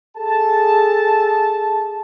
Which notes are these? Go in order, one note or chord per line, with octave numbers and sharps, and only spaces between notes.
G#4 A4 A5